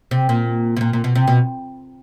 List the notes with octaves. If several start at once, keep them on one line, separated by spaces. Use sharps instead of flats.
C3
A#2
B2
A#2
A#2
B2
C3
B2